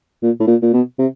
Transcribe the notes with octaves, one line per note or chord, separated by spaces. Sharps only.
A#2
A2
A#2
A#2
B2
C3